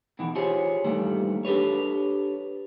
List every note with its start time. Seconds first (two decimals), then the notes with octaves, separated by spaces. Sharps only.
0.19 B2 D#3 E3
0.35 F4 G4 G#4 C5 C#5
0.84 G2 A#2 D#3 E3 G3 A3
1.45 D4 G4 A4 B4 C#5